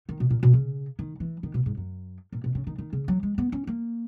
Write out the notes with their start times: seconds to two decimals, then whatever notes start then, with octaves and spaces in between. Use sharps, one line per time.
0.09 D#3
0.20 B2
0.30 A#2
0.43 B2
0.53 C#3
0.99 D#3
1.20 E3
1.43 D#3
1.54 B2
1.66 G#2
1.77 F#2
2.32 A#2
2.44 B2
2.55 C#3
2.67 D#3
2.78 D#3
2.93 C#3
3.08 F#3
3.23 G#3
3.38 B3
3.52 C#4
3.67 A#3